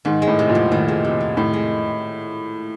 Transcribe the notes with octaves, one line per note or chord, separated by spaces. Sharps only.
G#2 D#3
G#3
A2
C3
A#2
F2
A2 D#3
G#3
C3
F2
A2 D#3
G#3